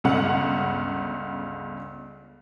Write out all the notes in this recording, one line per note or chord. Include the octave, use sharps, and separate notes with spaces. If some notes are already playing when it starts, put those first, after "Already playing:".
G1 C#2 C#3 F#5